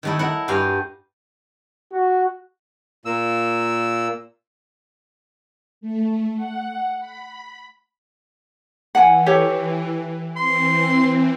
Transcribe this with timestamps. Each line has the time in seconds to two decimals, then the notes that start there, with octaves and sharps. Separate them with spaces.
0.03 D#3 A3 E4
0.19 E4 F#5 A#5
0.48 G2 F#4 G4 F5 G#5
1.93 F#4
3.05 A#2 A#3 E6
5.81 A3
6.36 F#5
6.99 B5
8.95 E3 F#5 G#5
9.26 G4 A4 C#5
10.36 E3 C4 C6